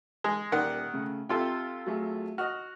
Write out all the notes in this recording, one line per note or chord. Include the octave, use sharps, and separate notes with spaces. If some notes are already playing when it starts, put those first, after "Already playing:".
G#3
D#1 D#3 D5 F#5
C#3 A3
C3 F4 A4 G5 C6
F#3 A3 G#4
F#4 D#5 F6